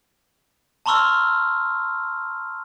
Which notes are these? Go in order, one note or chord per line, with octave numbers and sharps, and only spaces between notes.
A5 A#5 C6 C#6 E6 F6